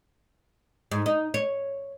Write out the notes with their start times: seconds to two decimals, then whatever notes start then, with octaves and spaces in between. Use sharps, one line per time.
0.91 G#2
1.06 D#4
1.34 C#5